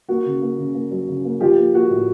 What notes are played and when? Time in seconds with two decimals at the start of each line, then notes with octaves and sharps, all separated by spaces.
0.09 A#3 F#4
0.26 C#3
0.42 A#3
0.58 C#3
0.75 A#3
0.91 F#3
1.08 C#3
1.25 A#3
1.40 F3 F4 G4
1.57 A#3
1.74 A#3 F#4
1.90 A2